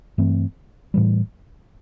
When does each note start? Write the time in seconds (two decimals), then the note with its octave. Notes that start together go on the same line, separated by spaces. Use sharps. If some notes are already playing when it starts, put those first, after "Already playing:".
0.18 G2 E3 A3 C4
0.94 A2 E3 G3